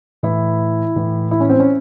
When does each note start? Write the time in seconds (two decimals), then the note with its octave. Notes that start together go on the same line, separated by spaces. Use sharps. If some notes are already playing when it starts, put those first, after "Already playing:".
0.23 A2 E3 E4
0.96 A2 E3
1.31 E4
1.40 C#4
1.49 C4
1.60 C#4